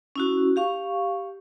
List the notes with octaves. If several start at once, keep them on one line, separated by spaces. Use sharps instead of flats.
C#4 E4 F#4
G4 F5 C#6